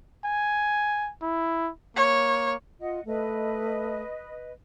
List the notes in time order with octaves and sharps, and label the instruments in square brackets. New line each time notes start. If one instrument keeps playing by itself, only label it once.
[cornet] G#5
E4
[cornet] A#3 [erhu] C#5
[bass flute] F4 [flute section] D#5 F#5
[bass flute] A3 [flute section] B4 D#5